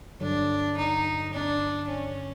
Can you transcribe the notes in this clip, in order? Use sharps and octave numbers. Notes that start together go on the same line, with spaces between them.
G2 D3 F#3 D4
D#4
D4
C#4